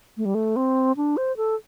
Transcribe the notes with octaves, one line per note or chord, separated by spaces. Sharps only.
A3
G3
A3
C4
D4
C5
A4